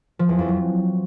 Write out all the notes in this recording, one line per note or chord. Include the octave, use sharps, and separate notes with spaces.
F3
E2
F2
F#3